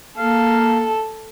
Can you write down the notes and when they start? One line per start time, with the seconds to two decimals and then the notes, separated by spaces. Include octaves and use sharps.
0.18 A#3 A4 F5